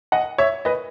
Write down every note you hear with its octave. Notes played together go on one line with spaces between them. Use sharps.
D#5 F#5
C#5 E5
B4 D#5